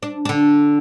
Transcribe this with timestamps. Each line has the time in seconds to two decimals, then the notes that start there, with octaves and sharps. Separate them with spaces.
0.03 D4
0.25 D3 D4